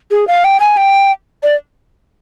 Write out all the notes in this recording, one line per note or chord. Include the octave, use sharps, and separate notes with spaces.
G#4
F5
G5
G#5
G5
D5